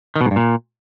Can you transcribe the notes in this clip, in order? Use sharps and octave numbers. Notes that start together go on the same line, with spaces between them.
D#3
B2
G#2
G2
A#2